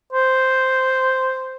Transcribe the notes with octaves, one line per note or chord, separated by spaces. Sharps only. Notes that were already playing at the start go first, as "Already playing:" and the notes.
C5